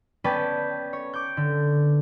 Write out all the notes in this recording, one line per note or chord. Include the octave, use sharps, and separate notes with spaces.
B3 C#4 B4 D5 G5 A5
C#5
D6 G6
D3